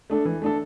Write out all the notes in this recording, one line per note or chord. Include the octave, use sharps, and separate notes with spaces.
A3 D4 A4
E3
A3 D4 A4